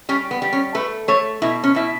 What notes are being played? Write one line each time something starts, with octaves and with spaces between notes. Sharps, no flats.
G3 C#4
B3
G3
C#4
A3 B4
A3 C#5
B2 E4
C#4
B2 E4